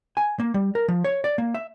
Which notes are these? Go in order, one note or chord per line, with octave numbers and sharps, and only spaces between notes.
G#5
A#3
G3
A#4
F3
C#5
D5
A#3
E5